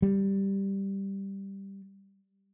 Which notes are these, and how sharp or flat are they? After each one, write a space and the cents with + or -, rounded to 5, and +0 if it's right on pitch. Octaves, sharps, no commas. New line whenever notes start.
G3 +0